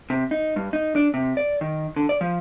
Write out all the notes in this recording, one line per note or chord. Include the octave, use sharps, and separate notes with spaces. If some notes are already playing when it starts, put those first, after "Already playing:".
C3
D#4
G2
D#4
D4
C3
D5
D#3
D3
D5
F3